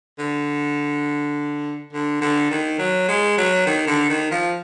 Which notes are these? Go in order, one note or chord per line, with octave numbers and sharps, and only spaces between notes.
D3
D3
D3
D#3
F#3
G#3
F#3
D#3
D3
D#3
F3